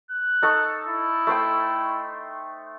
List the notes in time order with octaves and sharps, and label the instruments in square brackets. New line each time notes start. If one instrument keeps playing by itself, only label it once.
[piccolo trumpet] F#6
[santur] D#4 A4 C#6
[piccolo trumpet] E4
[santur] A3 C5 G5